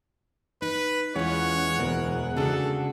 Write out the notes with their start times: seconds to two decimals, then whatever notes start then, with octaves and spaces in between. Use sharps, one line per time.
0.62 D#4 B4
1.15 E2 E3 G#3 C#4 F4 C#5 F#5
1.78 D2 B2 A#4
2.36 C#3 D4 F#4 G#4 A4